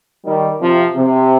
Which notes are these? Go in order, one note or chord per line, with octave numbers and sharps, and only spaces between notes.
D#3 G3
C3 F3
C3